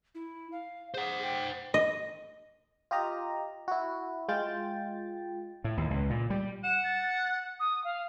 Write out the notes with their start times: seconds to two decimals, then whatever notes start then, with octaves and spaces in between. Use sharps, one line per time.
0.15 E4
0.52 F5
0.94 G#4 C5 F#5
1.23 G5
1.74 D#5
2.91 F4 G4 D#5 A#5
3.68 E4 F#4
4.28 G#3 F4 G5 A6
5.64 A2
5.77 D#2
5.91 C#2
6.10 A#2
6.30 G3
6.64 F#5 E7
6.84 A6
7.60 D#6
7.84 F5